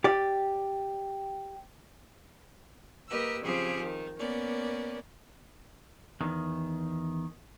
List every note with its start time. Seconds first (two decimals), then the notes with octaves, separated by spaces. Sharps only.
0.04 G4 D5
3.09 A#3 G4 A#4 B4 D#5 E6
3.44 C#3 F3 C4 G4 G#4
3.81 D#3
4.19 A#3 B3 C#4 D5
6.21 E2 D#3